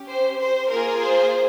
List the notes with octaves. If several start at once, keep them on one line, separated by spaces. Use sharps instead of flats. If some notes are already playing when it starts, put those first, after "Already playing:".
Already playing: C#4 G4
C5
C5
A#3 F4 G#4 A#4
C5